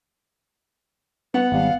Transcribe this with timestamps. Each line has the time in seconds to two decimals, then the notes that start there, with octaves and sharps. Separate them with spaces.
1.34 B3 B4 F#5
1.52 G#1 G3 F5 A5